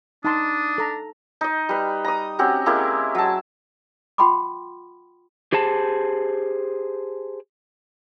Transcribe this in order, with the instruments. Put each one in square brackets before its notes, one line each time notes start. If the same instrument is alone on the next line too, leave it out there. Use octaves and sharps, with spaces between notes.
[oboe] D4 [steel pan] D#4 A5 C6 [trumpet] D#6
[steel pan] A4 A#5
[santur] D#4 D#5
G3 B4
A#5 D#6
C4 C#4 F#4 G4
G#3 A#3 E4 G4
F#3 A5
[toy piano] F4 F#5 G5 B5 C6 D6
[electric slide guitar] G4 G#4 C5 A5